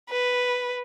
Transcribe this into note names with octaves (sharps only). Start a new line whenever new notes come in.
B4